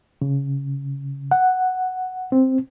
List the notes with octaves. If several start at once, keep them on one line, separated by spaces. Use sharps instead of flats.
C#3
F#5
C4